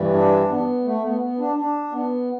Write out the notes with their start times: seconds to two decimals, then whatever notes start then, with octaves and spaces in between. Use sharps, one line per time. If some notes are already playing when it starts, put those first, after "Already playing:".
Already playing: G2 E3 G3
0.13 D4
0.49 B3
0.84 A3
1.03 B3
1.21 B3
1.39 D4
1.56 D4
1.92 B3